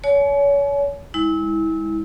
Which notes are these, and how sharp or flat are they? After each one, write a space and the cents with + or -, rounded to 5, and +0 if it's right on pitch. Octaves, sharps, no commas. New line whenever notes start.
C#5 +35 G#5 +45
G#3 -30 E4 -30